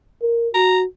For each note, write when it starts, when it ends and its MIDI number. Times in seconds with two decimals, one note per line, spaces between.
0.22 0.49 70
0.54 0.85 66
0.54 0.79 82